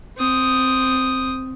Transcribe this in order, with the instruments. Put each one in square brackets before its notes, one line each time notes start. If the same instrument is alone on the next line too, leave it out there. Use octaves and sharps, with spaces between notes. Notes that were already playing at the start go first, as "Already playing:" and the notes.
[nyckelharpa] C4 D#6